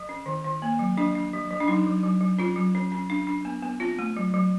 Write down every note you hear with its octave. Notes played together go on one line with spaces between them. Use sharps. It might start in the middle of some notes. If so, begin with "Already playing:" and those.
Already playing: F3
C#4
D#3
D#3
A#3
F#3
F3 D4
D4
F3
F3
D4
F#3 D#4
F#3
F#3
F#3
C#4 F4
F#3
C#4
C#4
D4
D4
B3
B3
C4 F4
A3
F#3
F#3